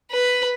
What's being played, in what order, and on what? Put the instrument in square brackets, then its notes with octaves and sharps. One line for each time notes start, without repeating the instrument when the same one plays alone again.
[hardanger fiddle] B4